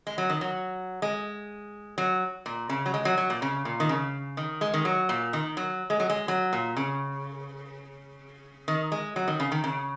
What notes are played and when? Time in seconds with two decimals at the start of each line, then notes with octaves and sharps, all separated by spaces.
0.07 G#3
0.18 F#3
0.30 D#3
0.41 F#3
1.02 G#3
1.98 F#3
2.46 A#2
2.69 C#3
2.86 F#3
2.94 G#3
3.05 F#3
3.18 F#3
3.30 A#2
3.42 C#3
3.65 A#2
3.80 D#3
3.89 C#3
4.37 D#3
4.61 G#3
4.74 D#3
4.85 F#3
5.09 A#2
5.33 D#3
5.57 F#3
5.90 G#3
6.00 F#3
6.10 G#3
6.28 F#3
6.53 A#2
6.76 C#3
8.68 D#3
8.92 G#3
9.16 F#3
9.28 D#3
9.40 C#3
9.52 D#3
9.64 C#3